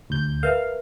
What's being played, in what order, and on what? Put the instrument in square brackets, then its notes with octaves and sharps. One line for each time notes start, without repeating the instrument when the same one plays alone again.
[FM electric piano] D2 G6
[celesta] A#4 B4 E5 [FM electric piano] F5